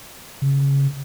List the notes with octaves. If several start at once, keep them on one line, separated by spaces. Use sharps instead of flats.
C#3